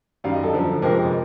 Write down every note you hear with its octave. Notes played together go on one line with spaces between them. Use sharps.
F#2 D#3 G3 F5
D#5
A4
F#2 D3 F3
F2 C3 F3 G#3 A#4